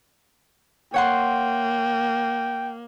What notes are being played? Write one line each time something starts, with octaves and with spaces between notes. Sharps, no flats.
A#3 C#5 F#5 G5 C6